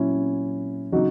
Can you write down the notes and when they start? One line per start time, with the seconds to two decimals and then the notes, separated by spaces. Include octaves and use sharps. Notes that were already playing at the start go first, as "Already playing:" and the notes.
Already playing: A#2 F#3 C#4 E4
0.92 C#3 F#3 D#4 F#4